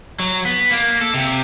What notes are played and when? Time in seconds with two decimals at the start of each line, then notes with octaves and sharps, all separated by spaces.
0.19 F#3
0.45 B3
0.70 A#3
1.01 A4
1.14 C3